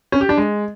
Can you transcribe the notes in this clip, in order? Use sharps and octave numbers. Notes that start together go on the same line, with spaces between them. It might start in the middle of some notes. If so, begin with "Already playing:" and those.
C#4
G4
D4
G#3